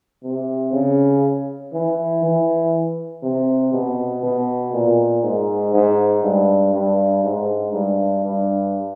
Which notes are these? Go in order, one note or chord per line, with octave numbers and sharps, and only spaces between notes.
C3
C#3
E3
E3
C3
B2
B2
A#2
G#2
G#2
G2
G2
G#2
G2
G2